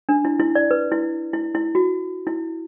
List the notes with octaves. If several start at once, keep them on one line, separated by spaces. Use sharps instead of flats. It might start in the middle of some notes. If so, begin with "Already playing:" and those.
D4
E4
E4
D5
B4
E4
E4
E4
F#4
E4